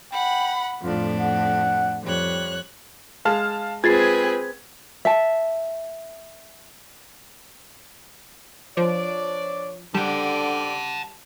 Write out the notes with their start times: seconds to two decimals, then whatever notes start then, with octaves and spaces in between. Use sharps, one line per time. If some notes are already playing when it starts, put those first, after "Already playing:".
0.12 F#5 G5 B5
0.83 F2 A2 D4 F4
1.19 F#5
2.05 F2 G3 C#5 F#6
3.25 G#3 F5 A5 F6
3.84 G#3 C4 F4 G#4 B4 G#6 A6 C7
5.05 E5 A5
8.77 F3 D4 C#5 D5
9.95 D3 G3 G4 C5 D5 F#5 A5